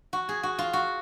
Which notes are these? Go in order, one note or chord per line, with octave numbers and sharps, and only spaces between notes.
F#4
G#4
F#4
F4
F#4